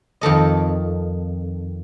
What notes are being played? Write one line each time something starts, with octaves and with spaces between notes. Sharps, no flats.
F2 D#3 A4 D#5